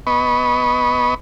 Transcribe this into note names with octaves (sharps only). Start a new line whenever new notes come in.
B3 D#5 B5 C#6